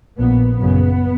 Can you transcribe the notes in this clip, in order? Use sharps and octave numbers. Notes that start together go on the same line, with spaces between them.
A#1 A#2 B3
F#1 F#2 C#3 B3